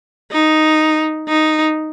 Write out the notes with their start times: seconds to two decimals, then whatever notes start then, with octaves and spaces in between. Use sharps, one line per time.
0.32 D#4
1.28 D#4